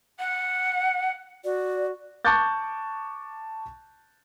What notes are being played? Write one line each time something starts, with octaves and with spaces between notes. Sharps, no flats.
F#5
F#4 D5
A5 C#6 D6 F#6 G6 A6